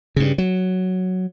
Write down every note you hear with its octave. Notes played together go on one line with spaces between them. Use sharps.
G2 C#3
F#3